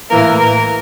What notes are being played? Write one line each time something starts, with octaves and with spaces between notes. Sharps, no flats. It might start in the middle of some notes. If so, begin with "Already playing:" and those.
A2 E3 A#3 A#4
A#4